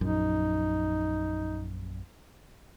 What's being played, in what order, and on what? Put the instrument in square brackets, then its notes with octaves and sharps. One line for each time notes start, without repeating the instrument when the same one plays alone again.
[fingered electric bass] A#1 F#2 [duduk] D#4